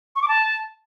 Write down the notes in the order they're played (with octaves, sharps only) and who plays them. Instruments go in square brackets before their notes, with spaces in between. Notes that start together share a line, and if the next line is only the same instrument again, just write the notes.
[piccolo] C#6
D6
A5